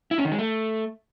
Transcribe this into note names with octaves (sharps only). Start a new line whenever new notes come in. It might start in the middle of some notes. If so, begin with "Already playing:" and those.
E4
C#4
D#3
G#3
A3